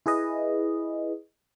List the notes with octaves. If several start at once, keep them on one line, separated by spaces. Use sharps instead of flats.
E4 G#4 B4 D#5